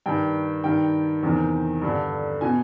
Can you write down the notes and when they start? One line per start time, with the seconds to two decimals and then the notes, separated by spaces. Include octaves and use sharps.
0.06 G2 D#3 G5
0.64 G2 D#3 G5
1.23 E2 C3 D#3
1.82 G2 D3
2.41 B2 G#5